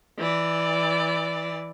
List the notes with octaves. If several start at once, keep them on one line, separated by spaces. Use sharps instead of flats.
E3 D5